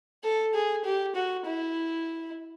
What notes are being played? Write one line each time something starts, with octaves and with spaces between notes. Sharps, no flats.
A4
G#4
G4
F#4
E4